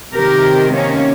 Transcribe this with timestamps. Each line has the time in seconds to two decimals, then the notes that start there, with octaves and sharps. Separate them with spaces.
0.14 C3 D#3 G4 A#4
0.73 A#3 C#4